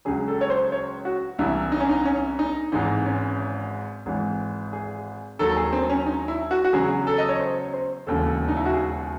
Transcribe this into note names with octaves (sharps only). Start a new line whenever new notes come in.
C#2 C#3 F#3 G#4
A4
C#5
C5
C#5
F#4
C2 C3 E3 E4
D#4
C#4
D#4
C#4
D#4
G#1 G#2 E3 D#4
C#4
G#1 G#2 E3
G#4
D#2 D#3 F#3 A4
G#4
C4
C#4
D#4
E4
F#4
F#4
E2 C#3 F#3 G#4
A4
D#5
C#5
C5
C5
E1 D#2 C#3 E3 A4
D#4
E4
F#4
G#4